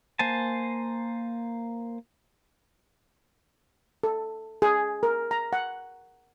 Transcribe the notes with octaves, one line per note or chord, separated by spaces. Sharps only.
A#3 C5 G#5 A5
A4
G#4
A#4
A#5
F#5